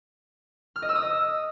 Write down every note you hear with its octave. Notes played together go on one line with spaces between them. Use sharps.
F6
D#5
E6
D#6
D#5